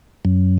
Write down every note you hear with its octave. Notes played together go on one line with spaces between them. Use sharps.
F#2